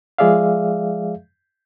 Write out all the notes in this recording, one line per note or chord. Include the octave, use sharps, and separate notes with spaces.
F3 G#3 G#4 D5 E5 F5